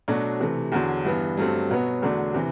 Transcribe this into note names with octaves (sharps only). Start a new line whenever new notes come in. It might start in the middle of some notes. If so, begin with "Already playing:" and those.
B2 F#3 A3 D4 F#4
C3 E3 A3
E2 D3 F#3
G2 E3 B3
G2 F#3 A3 C4
B2 F#3 B3 F#4
E2 D3 F#3 A3 D4
C3 E3